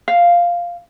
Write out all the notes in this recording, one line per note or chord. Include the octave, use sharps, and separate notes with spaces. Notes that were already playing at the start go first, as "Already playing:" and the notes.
F5